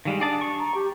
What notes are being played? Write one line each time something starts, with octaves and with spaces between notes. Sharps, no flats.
D#3 G3 G#3 F5
D4 G#4 D5 A5
C#6
A#5
G4